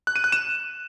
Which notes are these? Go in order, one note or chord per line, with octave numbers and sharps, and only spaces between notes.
F#6
D#7
F#6
E7